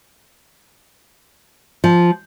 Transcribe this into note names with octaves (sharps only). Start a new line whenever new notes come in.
F3